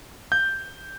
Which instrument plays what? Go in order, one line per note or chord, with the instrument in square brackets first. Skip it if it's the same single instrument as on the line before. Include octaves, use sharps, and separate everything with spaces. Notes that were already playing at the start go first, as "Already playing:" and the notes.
[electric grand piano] G6